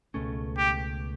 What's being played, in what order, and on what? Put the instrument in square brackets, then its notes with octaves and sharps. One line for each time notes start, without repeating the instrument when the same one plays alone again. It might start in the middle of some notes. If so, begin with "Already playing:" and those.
[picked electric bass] C#2 B2 A3 C#4
[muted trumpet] G4